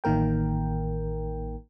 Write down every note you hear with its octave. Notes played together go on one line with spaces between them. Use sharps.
A1 D#3 A#3 A#4 G5